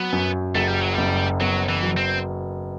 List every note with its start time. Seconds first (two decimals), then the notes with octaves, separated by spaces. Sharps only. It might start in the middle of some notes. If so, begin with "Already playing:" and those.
Already playing: F#3 B3
0.12 F#2
0.55 F#1 A3
0.68 G3
0.80 F#3
0.93 F#1 G3
1.40 F#3 B3
1.69 E3
1.83 F#3
1.97 C4